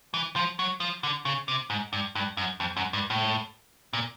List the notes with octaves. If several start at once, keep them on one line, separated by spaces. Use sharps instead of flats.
E3
F3
F#3
F3
D3
C#3
C3
G#2
G2
G2
F#2
F2
F#2
G2
A2
A#2